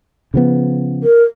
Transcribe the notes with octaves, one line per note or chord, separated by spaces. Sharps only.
C#3 F3 B3
A#4